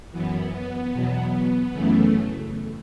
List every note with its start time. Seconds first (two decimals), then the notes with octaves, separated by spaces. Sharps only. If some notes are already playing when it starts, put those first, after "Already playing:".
0.12 F#2 E3 B3
0.53 B3
0.93 E2 B2 F#3
1.73 F#2 C#3 E3 A3